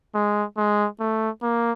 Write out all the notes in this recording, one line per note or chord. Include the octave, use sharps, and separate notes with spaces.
G#3
G#3
A3
A#3